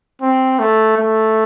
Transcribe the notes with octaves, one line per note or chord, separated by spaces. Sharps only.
C4
A3
A3